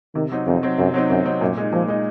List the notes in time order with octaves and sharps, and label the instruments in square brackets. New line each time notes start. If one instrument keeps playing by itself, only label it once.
[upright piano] C3 [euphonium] D#3
[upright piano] F#3 C4 D#4
[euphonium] F2 [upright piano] C3
[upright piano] F#3 C4 D#4
[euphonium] F#2 [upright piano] C3
[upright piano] F#3 C4 D#4
[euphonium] F#2 [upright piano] C3
[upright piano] F#3 C4 D#4
[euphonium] F#2 [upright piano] A#2
[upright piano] G#3 D#4
[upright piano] A#2 [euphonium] F3
[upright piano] G#3 D#4